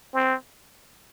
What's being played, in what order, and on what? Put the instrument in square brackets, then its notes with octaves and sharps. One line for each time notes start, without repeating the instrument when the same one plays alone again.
[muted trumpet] C4